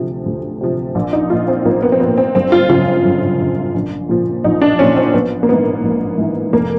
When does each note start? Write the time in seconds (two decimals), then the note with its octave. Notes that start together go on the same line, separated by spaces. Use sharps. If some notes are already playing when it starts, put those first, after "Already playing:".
Already playing: D2 C3 F3
0.26 D2
0.61 C3 F3
0.95 A#1
1.13 D#4
1.30 A#2 F3 F4
1.48 C4
1.65 A#1 A#3
1.83 B3
1.92 C4
2.00 A#2 F3 B3
2.17 C4
2.35 G1 C4
2.52 F4
2.70 F#2 C#3 F4
3.05 G1
3.39 F#2 C#3
3.74 A#1
4.09 A#2 F3
4.44 A#1 D#4
4.61 D4
4.79 A#2 F3 C#4
4.96 C4
5.14 A#1 B3
5.43 A#3
5.49 G#2 E3 B3
5.83 A#1
6.18 G#2 E3
6.53 F1 A#3